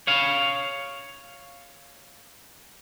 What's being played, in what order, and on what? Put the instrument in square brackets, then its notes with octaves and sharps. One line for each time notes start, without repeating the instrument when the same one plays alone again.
[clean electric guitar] C#5 F5